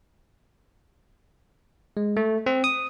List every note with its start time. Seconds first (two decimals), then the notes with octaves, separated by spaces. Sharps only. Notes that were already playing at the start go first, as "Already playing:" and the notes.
1.97 G#3
2.17 A3
2.46 C4
2.64 D#6